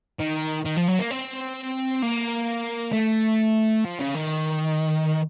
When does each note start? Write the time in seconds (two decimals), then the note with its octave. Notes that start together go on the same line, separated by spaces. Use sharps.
0.20 D#3
0.65 D#3
0.76 F3
0.88 F#3
0.99 A#3
1.11 C4
2.02 A#3
2.93 A3
3.85 F3
4.00 C#3
4.15 D#3